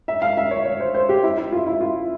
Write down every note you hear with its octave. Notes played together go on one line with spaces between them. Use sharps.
E5
F5
E5
C#5
C#5
C5
C5
G4
E4
E4
F4
E4
F4